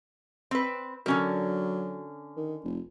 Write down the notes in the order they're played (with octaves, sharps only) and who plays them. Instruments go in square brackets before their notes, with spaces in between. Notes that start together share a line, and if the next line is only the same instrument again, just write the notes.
[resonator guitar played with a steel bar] C4 B4
[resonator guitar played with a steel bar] D3 C#4 A#4 [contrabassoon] F#3
[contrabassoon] D#3
F1